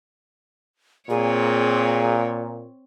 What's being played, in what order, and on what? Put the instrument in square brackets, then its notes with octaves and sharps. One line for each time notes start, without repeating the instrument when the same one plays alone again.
[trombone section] A#2 [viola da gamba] C4 C#5 [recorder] G#4